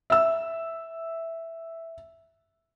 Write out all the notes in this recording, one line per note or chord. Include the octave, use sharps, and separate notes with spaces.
E5 E6